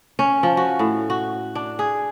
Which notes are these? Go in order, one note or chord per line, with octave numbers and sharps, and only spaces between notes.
C#4
F3
F#4
A2
F#4
D4
G#4